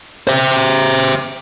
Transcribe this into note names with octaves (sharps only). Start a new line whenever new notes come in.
C5 E5